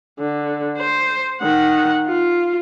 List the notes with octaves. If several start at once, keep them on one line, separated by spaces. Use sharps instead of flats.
D3
C5
D#3 F#5
F4